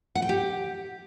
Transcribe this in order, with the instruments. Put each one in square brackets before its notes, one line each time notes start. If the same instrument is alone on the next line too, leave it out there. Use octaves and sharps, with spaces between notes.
[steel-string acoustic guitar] F#5
G5
G4